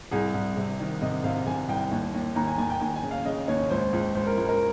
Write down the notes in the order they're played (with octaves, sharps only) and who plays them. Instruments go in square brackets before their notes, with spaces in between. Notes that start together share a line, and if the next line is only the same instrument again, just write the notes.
[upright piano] C2 G#4
C2
C3
D#3
C3 D#5
C3 F5
C3 G#5
C2 G5
D#2
D#2
D#2 A#5
G#5
D#2 G#5
G5
D#2 G#5
G#5
C#3
F5
C#3 D#5
D#2 C#5
C#2 C5
C#2
C#2 C5
A#4
C#2
A#4